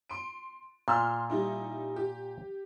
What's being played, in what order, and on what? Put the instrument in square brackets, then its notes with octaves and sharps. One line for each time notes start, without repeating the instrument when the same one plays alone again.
[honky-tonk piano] C6 D7
[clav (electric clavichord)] A#2 [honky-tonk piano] C6 E6 F6
[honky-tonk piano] G3 D#4 E4
G4